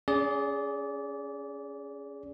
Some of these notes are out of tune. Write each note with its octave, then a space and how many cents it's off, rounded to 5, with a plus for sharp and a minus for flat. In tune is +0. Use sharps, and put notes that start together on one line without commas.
C#4 +15 G#4 +0 D5 -25